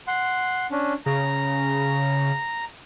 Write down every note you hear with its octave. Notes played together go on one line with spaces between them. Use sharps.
F#5 C6
C#4 D4
C#3 A#5